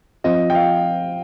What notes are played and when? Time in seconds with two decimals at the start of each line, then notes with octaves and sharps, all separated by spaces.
0.24 F3 C4 F4 D#5
0.50 G5
0.55 F5